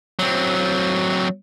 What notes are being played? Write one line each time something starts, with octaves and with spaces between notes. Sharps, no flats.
F#3 C4